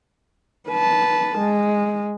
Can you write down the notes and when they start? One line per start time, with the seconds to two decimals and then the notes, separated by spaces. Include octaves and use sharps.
0.69 B4 A5
1.38 G#3